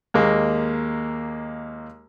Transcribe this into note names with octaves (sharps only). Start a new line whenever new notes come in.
D#2 G#3 A#3